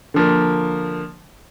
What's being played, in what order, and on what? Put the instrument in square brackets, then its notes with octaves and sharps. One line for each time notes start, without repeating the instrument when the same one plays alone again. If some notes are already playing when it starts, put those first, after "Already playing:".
[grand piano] D3 F3 A#3